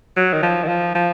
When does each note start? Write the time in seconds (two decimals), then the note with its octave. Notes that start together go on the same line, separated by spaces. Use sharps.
0.16 F#3
0.33 D#3
0.42 F3
0.64 D#3
0.68 F3
0.95 F3